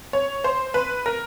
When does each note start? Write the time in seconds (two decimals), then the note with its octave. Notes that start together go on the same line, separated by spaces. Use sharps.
0.13 C#5
0.44 C5
0.74 B4
1.06 A#4